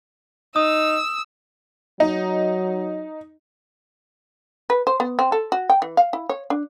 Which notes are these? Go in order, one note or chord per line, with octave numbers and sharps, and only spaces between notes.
D#4 D#6 E6
F#3 D#4
B4
C5
B3
C4
A4
F#4
G5
E3
F5
E4
C#5
D4